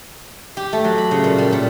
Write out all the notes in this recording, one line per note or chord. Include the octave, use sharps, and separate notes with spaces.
G4
A3
F#3
B5
C#3
A#2
G3
A#2